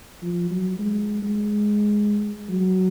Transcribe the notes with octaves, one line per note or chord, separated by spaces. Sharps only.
F3
F#3
G#3
G#3
F#3